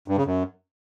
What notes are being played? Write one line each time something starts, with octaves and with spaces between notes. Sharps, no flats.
G2
C#3
F#2